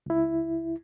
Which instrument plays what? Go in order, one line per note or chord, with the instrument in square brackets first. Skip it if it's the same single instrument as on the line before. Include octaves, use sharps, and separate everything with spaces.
[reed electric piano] C#2 E4